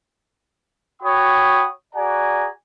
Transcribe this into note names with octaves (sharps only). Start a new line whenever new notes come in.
F#4 C#5 G5 B5 D#6
F#4 G#4 D5 F#5 G#5 A#5